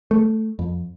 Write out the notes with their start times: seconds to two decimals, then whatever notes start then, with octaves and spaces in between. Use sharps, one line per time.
0.11 A3
0.59 F2